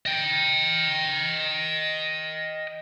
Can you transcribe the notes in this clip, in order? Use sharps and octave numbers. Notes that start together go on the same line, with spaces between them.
D#5 G5